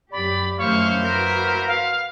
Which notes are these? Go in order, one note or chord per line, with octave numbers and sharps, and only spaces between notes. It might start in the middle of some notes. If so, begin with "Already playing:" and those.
F#2 G4 D5 B5
F#2 D#3 A3 A#3 E4 C5 F5 C#6
F#4 A#4 B4 F6
F5